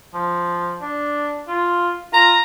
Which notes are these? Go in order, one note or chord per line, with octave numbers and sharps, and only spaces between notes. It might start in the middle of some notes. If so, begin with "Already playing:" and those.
F3
D4
F4
F4 A#5